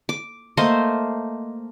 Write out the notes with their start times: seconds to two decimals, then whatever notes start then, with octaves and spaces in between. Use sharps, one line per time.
0.09 D6
0.57 A3 A#3 C5 D#5